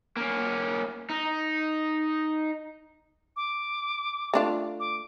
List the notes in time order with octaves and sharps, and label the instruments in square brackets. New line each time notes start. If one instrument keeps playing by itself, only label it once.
[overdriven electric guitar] A#3 C#4
D#4
[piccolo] D6
[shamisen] A3 D4 F4
[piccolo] D6